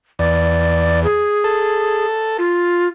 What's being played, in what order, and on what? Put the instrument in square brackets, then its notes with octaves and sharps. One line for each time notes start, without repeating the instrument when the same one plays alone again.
[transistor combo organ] E2 [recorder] D5
[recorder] G#4
[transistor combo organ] A4
[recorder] F4